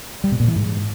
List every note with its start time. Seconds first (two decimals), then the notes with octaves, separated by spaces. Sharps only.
0.24 G3
0.32 B2
0.40 A#2
0.48 E3
0.56 G#2